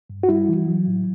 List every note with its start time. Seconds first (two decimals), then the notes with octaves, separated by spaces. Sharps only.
0.10 G2
0.23 F#4
0.29 G3 E4
0.49 E3
0.68 F#3
0.87 A2